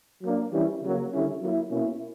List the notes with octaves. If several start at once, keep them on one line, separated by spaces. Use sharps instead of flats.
F#3 A#3 D4
E3 G3 C#4 E4
C#3 F#3 A#3
D3 G3 C#4 E4
F#3 A#3 E4
B2 A#3 C#4 E4